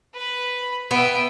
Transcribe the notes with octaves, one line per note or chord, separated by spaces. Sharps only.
B4 B5
B3 E5 G5